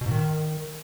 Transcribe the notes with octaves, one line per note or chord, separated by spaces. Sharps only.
B2
G#2
D#3